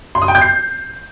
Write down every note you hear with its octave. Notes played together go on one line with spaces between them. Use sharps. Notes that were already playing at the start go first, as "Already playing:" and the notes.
C6
D#6
G5
G6
C7